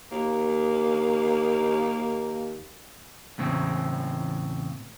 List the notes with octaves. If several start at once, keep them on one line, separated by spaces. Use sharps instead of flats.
D#2 A#3
D#2
E2 A2 C#3 C4